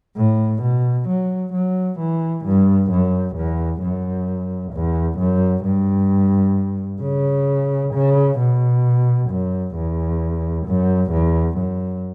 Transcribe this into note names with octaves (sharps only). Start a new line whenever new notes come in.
A2
B2
F#3
F#3
E3
G2
F#2
E2
F#2
E2
F#2
G2
C#3
C#3
B2
F#2
E2
F#2
E2
F#2